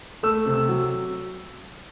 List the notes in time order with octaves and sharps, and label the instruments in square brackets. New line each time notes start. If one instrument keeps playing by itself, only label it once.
[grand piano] A3 E6
C3
E6
F#3